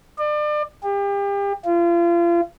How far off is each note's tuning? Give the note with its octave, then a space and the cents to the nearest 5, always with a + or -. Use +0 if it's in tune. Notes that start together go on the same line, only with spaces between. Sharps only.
D5 +35
G4 +35
F4 -35